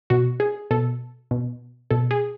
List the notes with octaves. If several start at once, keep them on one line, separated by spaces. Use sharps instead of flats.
B2 F#4
G#4
B2 A4
B2
B2 A4
G#4